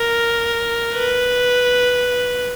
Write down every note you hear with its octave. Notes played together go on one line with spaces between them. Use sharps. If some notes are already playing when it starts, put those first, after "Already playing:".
Already playing: A#4
B4